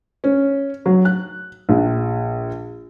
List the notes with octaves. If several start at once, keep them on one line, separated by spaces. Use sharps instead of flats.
C#4
F#3
F#6
A#1